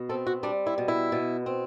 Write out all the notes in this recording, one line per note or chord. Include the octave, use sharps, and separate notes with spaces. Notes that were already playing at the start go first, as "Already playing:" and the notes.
Already playing: B2
C4 A4
F#4
G3 D4
E4
B2
E4
B2
C4